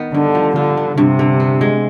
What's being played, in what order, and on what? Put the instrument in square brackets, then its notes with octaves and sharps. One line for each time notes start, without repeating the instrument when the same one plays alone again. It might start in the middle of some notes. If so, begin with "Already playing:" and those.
Already playing: [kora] D#3 B3
[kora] G2 [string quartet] D3
[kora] F3
[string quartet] D3 [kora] F4
[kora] B3
[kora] G2 [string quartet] C3
[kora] D3
B3
G#3